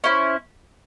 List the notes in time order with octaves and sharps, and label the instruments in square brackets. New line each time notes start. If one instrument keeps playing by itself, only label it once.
[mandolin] C#4 E4 C5